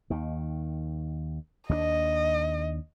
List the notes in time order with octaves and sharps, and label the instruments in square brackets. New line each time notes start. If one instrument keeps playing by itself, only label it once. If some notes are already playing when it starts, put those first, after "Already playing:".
[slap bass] D#2 D#3
[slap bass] D#2 A#3 D4 [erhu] D#5